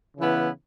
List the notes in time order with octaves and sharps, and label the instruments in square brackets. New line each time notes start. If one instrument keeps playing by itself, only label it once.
[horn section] C#3 E3 B3 E4 B4